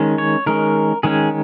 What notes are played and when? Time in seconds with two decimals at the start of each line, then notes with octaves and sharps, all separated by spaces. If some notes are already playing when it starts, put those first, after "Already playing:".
Already playing: D#3 G#3 C#4
0.18 C#5
0.46 D#3 G#3 C#4 A#4
1.03 D#3 G#3 C#4 G#4